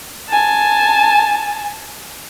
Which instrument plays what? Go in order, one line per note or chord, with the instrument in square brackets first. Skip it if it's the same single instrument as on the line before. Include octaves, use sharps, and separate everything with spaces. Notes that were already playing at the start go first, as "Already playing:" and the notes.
[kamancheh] G#5 A5